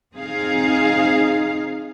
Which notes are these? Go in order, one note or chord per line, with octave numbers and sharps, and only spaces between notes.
C4 D#4 G#4 F5